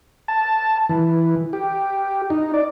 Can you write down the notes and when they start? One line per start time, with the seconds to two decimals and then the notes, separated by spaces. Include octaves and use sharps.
0.28 A5
0.89 E3
1.53 G4
2.30 D#4
2.54 D5